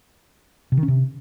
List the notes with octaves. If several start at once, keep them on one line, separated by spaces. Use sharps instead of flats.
C3
D#3
C#4
C3